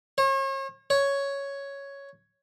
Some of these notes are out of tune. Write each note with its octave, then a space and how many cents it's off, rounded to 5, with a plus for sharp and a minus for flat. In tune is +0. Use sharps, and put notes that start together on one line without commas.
C#5 -40
C#5 +5